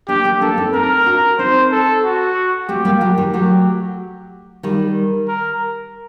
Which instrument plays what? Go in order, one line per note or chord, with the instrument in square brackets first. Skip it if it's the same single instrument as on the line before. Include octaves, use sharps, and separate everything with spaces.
[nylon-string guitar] A#3 D4 [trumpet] G4
[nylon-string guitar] A#3 D4
[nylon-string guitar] A#3 D4 [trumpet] A4
[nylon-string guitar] C4 D#4
[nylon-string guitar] C4 D#4 [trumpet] A#4
[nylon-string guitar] D4 F#4
[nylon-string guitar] C4 D#4 [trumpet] C5
[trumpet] A4
F#4
[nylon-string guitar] A3 C4 [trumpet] G4
[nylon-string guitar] G3 A#3
F#3 A3
D#3 G3
[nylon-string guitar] F#3 A3 [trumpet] G4
[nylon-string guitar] D#3 G3
[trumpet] A#4